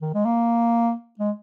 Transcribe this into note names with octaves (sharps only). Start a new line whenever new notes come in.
D#3
G#3
A#3
G#3